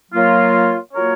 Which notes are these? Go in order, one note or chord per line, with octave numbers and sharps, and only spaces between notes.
F#3 A#3 F4 A#4 C#5
F#3 A#3 F4 A#4 C#5